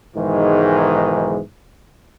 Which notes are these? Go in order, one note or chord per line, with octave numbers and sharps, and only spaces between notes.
B1 G#2 D#3 E3 G#3